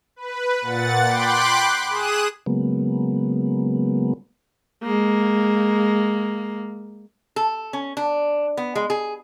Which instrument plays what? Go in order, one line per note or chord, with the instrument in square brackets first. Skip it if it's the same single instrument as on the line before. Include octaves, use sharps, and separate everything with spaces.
[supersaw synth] B4
A#2 F#5 A6
G5 B5 C6 D6 F#6
G#4 D#6 F#6 E7
[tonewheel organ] C#3 F#3 G#3 A#3 B3
[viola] G#3 A#3
[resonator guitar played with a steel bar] A4
C#4
D4
B3
G#3
G#4